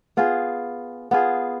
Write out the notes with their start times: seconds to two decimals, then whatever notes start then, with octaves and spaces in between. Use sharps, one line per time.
0.17 B3 F4 G#4
1.11 B3 F4 G#4